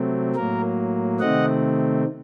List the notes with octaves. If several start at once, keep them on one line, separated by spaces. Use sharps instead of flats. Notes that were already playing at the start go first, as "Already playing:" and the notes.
Already playing: C3 F#3 A3 C4
A2 F#3 A#3 A#4
C3 D#3 A3 C4 D#5 F#5